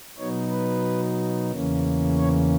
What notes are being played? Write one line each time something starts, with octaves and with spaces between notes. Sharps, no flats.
B2 F#3 B3 D#4 C#5
B4
E2 C#3 E3 A#3 C#4
C#5